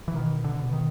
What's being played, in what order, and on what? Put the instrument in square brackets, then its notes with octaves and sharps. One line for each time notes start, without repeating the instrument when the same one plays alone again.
[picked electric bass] E3
B2 D#3
D3
B2
D#3